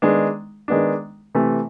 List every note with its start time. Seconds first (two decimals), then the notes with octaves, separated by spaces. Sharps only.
0.02 D#3 G#3 B3 D4
0.68 D#3 G#3 B3 D4
1.35 C3 E3 A3